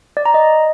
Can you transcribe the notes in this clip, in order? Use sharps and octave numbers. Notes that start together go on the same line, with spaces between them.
D5
A#5
D#5